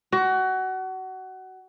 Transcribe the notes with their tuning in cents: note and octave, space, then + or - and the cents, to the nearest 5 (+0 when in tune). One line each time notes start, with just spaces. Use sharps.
F#4 +25